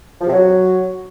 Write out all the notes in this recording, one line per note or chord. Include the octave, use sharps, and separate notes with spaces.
F3
C3
F#3